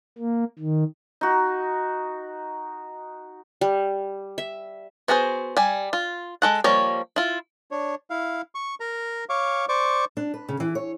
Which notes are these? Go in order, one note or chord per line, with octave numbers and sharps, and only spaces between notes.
A#3
D#3
D#4 F#4
G3
E5
B3 F#4 G#4 A#4 C5
G3 G#5
F4
G#3 A4 F#5
F3 G3 A#3 C#5
E4 F4
D4 C#5
E4 F5
C#6
A#4 A#5
C#5 F5 C#6 D6
C5 D5 C#6 D6
D4
B4
C#3
E3
C#5